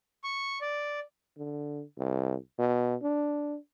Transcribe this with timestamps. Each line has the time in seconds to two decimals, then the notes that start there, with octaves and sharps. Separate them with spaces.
0.24 C#6
0.61 D5
1.37 D3
1.98 C2
2.58 B2
3.03 D4